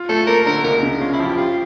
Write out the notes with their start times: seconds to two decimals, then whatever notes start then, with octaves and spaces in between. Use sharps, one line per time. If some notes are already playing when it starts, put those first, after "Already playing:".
Already playing: F4
0.09 A3 A4
0.27 A#3 A#4
0.46 D3 A#4
0.64 C#2 A#4
0.83 C#3
1.01 C#4 F4
1.13 E4
1.20 F3
1.25 G4
1.38 F4 G4